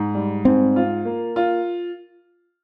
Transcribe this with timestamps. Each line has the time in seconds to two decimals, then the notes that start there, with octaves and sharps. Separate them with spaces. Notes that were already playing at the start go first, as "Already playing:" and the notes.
Already playing: G#2
0.15 G3
0.45 G#2 C4
0.76 F4
1.05 A#3
1.36 F4